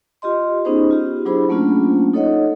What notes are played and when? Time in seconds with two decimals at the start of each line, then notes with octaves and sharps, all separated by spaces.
0.22 F4 G4 D#5 C6
0.65 B3 C#4 D#4 G4 G#4 C5
0.91 F4 G4
1.25 F#3 D4 E4 G#4 C5 B5
1.49 F#3 A3 A#3 C#4 D4 F4
2.13 D#4 A4 C#5 D#5 F#5